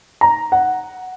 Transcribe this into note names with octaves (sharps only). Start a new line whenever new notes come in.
A#5
F#5